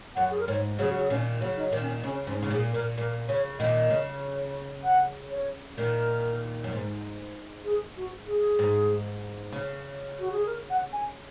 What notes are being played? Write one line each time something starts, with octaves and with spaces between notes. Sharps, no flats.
F#2 F#5
G#4
A#4
G#2 C#5
C#3 F#3 G#4
F#4
G#4
A#2 D#3 C#4
A#3
C#3 F#3
D#4
A#2 D#3
C#4
C#3 C#4
G#2 C#4
C#3
A#2 G#4
A#2 A#4
A#2 A#4
C#3 C#5
A#2 D#3 D#5
C#3
F#5
C#5
A#2 D#3 A#4
F#2
G#2
G#4
F#4
G#4
G#2
C#3
F#4
G#4
A#4
F#5
G#5